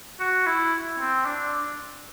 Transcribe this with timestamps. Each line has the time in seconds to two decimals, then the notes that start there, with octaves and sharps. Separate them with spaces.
0.20 F#4
0.46 E4
0.99 C4
1.26 D4